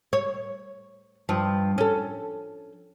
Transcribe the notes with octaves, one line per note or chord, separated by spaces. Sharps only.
C#5
G2 F3
C#4 A4